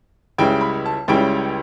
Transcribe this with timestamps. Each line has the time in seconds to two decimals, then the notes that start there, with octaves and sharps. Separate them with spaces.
0.38 C#2 C#3 G3 C#4 E4 G5
0.61 B5
0.86 A5
1.08 C#2 C#3 G3 C#4 E4 G5